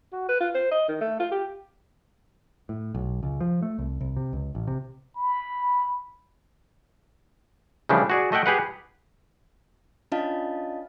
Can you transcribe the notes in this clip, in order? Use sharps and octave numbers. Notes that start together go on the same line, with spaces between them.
F#4
B4
F4
C5
D#5
D#3
A3
F4
G4
A2
B1
C#2
F3
A3
C2
C2
C3
C#2
A1
C3
B5
C#3 E3 F3 G3 A3 D4
F#4 G#4 D5
A3 D#5 E5 F#5 G5
G4 G#4 B4 F#5
C#4 D4 F4 D#5 F5 A5